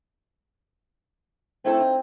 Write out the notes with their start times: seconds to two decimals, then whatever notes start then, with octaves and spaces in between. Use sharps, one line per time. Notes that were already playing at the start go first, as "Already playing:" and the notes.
1.65 A3 C4 E4 A4
1.80 D#4